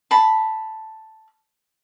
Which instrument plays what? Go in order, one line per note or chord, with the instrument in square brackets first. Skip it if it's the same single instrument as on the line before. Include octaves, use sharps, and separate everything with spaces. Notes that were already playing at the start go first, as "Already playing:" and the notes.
[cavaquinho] A5 B5